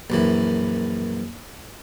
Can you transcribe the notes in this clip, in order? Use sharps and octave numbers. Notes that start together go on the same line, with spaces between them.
A#1 F#2 E3